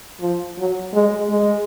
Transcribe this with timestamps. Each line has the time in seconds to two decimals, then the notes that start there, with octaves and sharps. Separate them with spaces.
0.21 F3
0.58 F#3
0.94 G#3
1.30 G#3